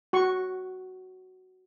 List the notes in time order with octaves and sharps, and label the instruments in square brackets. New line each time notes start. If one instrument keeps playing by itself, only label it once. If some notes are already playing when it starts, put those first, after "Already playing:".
[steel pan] F#4 C#6